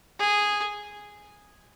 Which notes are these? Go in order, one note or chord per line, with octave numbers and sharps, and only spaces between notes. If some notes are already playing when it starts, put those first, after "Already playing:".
G#4